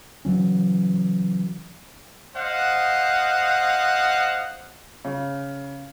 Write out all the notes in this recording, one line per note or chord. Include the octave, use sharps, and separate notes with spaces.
C#3 E3 F#3 C#4
C5 D#5 F5 F#5
C#3